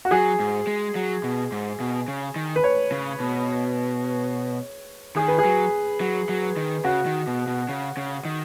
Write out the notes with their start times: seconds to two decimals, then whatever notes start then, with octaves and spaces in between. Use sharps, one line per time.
0.05 F#4
0.11 F#3 G#4
0.40 G#2
0.67 G#3
0.95 F#3
1.24 B2
1.52 G#2
1.80 B2
2.08 C#3
2.36 D#3
2.56 B4
2.64 C#5
2.92 C#3
3.20 B2
5.16 D#3 G#4
5.28 B4
5.38 G#4
5.45 F#3
6.01 F#3
6.29 F#3
6.57 D#3
6.84 C#3 F#4
7.06 D#3
7.27 B2
7.47 B2
7.69 C#3
7.97 C#3
8.25 D#3